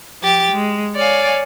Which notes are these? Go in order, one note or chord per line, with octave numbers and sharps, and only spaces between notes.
F3 G4 A6
G#3
C#5 D5 F5 G#5